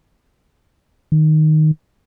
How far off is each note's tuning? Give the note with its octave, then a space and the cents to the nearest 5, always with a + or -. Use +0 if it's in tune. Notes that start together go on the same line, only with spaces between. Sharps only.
D#3 -5